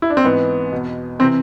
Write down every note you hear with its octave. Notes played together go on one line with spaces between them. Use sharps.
E4
D4
C4
G#2 E3 B3
E2 B2
C3 E3 C4